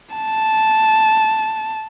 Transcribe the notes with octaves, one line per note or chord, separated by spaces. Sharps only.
A5